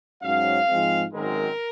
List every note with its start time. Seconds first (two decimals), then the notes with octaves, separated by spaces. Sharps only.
0.23 G#2 F#3 C#4 F5
0.68 G#2 F3 G#3 C4
1.13 G#1 F#2 D#3 G#3 C4 A#4